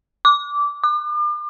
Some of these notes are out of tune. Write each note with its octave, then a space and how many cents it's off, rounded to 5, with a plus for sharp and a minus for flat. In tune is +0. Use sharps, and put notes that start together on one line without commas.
D6 -15
D6 +40